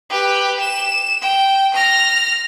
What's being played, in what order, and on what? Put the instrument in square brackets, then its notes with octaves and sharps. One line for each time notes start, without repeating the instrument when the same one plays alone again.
[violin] G4 B4
E7
G5
F6 A#6